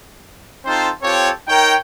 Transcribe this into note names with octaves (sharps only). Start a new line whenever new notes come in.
C4 D#4 F4 A4 C5
C4 F4 G4 A4 C#5
D#4 A#4 C#5 G5